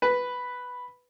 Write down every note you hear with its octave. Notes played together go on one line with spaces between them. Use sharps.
B4